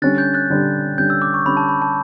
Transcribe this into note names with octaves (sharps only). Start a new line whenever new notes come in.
D3 G3 C#4 F#6 A6
G6
F#6 A6
D3 G3 C#4
D3 G3 C#4 G6
E6
D6
C#6
D3 G3 C#4 B5
A5
B5
A5